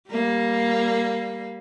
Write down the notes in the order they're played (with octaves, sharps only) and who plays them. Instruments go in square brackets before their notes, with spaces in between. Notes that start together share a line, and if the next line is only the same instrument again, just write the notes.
[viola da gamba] G3 A#3